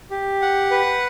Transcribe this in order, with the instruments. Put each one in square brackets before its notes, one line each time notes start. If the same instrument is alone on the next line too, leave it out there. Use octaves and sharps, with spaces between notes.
[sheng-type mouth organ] G4
F#5
B4